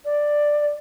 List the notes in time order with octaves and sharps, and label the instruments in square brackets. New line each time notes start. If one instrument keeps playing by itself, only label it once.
[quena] D5